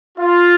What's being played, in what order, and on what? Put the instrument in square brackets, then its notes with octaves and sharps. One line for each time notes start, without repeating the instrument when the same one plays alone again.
[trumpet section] F4